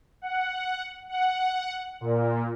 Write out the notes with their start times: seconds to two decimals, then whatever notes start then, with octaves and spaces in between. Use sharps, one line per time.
0.22 F#5
1.09 F#5
2.01 A#2